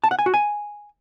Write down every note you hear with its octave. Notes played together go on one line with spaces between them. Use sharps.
A5
F#5
G#5
F#4
G#5